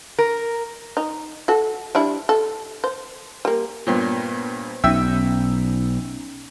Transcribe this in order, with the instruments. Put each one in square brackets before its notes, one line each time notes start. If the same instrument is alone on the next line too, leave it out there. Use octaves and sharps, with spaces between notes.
[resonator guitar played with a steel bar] A#4
[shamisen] D#4
F#4 A4
G3 D4 E4
A4
C5
G3 A#3
[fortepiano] G2 A#2 [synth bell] B3 C5 C#5
[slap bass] B1 [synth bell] C#4 D#4 [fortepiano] E5 G5 E6